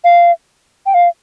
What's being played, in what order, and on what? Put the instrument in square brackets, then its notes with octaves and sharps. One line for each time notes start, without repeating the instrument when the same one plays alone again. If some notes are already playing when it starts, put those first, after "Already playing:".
[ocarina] F5
G5
F5